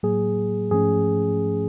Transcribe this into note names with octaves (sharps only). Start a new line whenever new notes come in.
A2 F#3 A#3 G#4
G#2 F3 A3 C#4 G#4